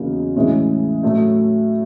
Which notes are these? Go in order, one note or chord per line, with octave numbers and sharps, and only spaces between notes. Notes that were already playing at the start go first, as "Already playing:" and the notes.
Already playing: E2 C#3 F#3 A#3 D#4
A2 E3 G#3 C#4
A2 F#3 A3